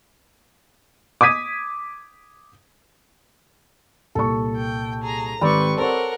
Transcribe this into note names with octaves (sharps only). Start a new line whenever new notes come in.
D6 D#6 G#6 B6 D#7
C2 A#2 A4 C#6
G5
G#4 A#5
G#1 G3 C4 B4 D5 C#6
A4 A#4 C5 C#5 F#5